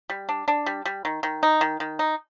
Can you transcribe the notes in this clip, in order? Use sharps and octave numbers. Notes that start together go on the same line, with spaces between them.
G3
D4
D4
G3
G3
D#3
D#3
D#4
D#3
D#3
D#4